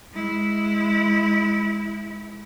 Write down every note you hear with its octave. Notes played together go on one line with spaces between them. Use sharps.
G#3 E4